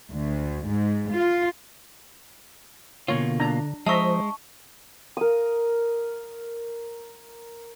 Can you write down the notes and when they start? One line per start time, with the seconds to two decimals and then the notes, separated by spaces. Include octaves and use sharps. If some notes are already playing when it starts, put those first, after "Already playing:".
0.10 D2
0.68 G#2
1.14 F4
3.08 B2 D3 A#3 F4 C#5
3.40 D4 A#5
3.86 F3 G#3 C5 D#5 E5 A5 A#5 C#6
5.17 A#4 D#6